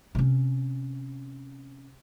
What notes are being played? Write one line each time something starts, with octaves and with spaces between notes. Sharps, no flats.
C3 C#4